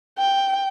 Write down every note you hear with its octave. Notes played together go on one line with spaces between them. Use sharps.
G5